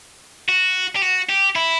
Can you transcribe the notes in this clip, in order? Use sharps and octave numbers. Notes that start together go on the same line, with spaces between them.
F#4
G4
F#4
G4
E4